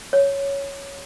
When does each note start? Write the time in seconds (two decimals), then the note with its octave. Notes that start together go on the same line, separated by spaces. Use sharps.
0.13 C#5